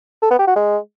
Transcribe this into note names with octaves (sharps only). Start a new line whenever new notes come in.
A4
B3
G4
F#4
G#3